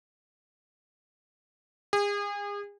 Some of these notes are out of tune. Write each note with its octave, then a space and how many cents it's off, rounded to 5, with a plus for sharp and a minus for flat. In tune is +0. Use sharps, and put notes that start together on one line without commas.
G#4 -35